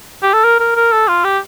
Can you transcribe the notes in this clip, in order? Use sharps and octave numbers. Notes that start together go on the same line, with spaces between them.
G4
A4
A#4
A#4
A#4
A4
F4
G4